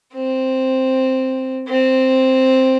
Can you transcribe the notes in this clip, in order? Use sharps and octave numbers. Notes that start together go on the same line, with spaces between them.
C4
C4